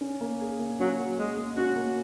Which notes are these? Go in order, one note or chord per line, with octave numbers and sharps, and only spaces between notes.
C#4
A#3
G#4
A#3
F#3 C#4
A#3
G#3 G#4
A#3
C#4 F#4
A#3